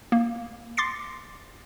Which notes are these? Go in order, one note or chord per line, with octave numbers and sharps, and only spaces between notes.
A#3
C6 D6 A6 A#6 C7 C#7